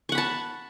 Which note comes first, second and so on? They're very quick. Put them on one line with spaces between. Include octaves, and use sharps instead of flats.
C#6 F#5 B5 A5